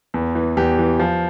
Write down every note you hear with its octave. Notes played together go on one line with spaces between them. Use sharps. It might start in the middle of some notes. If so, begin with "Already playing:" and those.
E2
E3
E2 G4
E3
F3